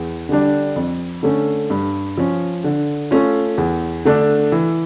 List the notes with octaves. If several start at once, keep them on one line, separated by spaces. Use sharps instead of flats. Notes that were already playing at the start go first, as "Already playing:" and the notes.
Already playing: E2
D3 G3 D4
F2
D3 A3 C#4
G2
F3 C#4
D3
A3 C#4 F4
E2
D3 A3 D4
E3